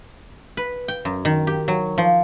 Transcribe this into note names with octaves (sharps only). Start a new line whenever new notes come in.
B4
G5
F#2
D#3
G4
F#3
F3